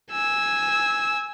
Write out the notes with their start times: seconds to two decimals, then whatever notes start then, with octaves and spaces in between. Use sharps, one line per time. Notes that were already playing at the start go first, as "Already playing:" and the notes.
0.11 G#5 E6